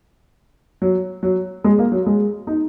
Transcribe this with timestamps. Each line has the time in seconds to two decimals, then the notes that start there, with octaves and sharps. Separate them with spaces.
0.82 F#3
1.23 F#3
1.64 G#3
1.79 A#3
1.92 F#3
2.06 G#3
2.47 D#4